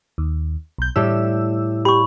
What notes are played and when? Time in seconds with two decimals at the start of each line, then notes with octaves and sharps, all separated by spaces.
0.18 D#2
0.78 B1 G6
0.96 A2 G3 G4 E6
1.85 G4 B5 C#6